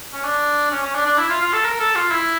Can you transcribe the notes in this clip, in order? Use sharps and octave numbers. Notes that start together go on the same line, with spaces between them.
C#4
D4
C#4
C#4
D4
D4
E4
F4
F4
A4
A#4
A4
F4
E4